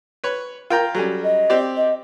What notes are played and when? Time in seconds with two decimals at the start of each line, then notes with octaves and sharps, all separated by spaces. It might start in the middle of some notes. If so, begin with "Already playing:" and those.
0.24 B4 C#5
0.70 F4 A#4 G5 A#5
0.95 F#3 G3 C#4 A4
1.23 D#5
1.50 C4 G4 D5
1.77 D#5